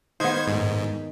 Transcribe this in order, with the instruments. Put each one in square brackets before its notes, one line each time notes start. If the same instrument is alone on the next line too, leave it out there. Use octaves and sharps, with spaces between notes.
[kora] D#3 B3 [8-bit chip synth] C5 G#6
[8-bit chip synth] G#2